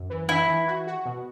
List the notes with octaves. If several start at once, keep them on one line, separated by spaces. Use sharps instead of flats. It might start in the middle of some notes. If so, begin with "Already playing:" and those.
Already playing: F#2
E3
E3 E4
E3
F#4
F#4
B2